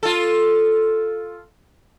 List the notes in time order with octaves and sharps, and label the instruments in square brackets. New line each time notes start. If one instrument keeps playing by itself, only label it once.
[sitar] F4 A4